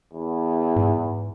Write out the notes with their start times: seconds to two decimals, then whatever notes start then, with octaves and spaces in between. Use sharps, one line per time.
0.14 E2
0.76 G#2